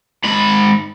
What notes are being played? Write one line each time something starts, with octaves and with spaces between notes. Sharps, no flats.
G#2 B5